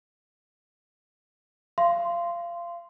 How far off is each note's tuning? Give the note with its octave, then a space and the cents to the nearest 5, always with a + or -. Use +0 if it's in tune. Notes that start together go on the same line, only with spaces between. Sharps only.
F5 -25 C6 -10